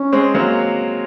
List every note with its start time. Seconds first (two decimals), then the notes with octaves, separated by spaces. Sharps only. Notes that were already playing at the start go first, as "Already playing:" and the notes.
Already playing: C#4
0.13 G#3 C4
0.34 F#3 A#3